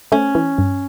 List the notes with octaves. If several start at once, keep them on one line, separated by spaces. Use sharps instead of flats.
A3 C#4
E3
G2